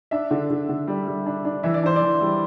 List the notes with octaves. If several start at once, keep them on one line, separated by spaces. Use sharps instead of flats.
D4 E5
D3
D3
D3
G3
G3
D4
D4
E3 E5
D5
D4 C5
D5
E3
G3